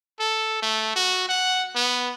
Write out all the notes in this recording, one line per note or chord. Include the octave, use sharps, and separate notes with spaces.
A4
A3
F#4
F#5
B3